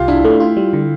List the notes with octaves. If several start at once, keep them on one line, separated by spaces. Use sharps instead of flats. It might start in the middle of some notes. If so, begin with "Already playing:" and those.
Already playing: C2 F4 G4
D4 E4
A3
F4
G3
D3